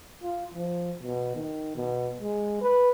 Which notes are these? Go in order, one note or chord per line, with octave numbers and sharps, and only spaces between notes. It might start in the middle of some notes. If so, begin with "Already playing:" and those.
F4
F3
B2
D#3
B2
G#3
B4